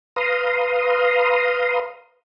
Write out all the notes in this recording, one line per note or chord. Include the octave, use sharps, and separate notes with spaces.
B4 F5 A#5 C6 D#6